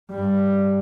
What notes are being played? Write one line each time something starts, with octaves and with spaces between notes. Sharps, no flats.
G2 G3